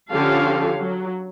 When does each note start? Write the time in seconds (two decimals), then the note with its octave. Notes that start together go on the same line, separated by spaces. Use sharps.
0.12 D3 F3 C#4 G4 A4 F5
0.78 F#3